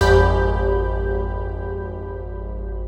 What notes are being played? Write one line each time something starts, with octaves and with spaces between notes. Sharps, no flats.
G#1 F2 G4 B5 G6